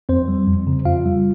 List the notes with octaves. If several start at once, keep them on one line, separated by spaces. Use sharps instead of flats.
F2 C4 C5
G3
F2
C#3
F2 F4 F5
G3